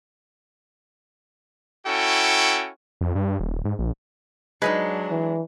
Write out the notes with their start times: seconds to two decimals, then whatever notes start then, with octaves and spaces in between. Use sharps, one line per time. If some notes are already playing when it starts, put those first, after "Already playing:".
1.86 C#4 E4 F#4 A4 G5
3.01 F2
3.15 G2
3.40 D#1
3.65 G#2
3.79 A#1
4.62 F#3 G#3 D4 D#4 G#4 B4
5.10 E3